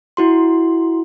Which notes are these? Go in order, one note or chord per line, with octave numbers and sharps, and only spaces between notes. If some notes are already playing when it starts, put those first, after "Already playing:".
E4 F#4 C6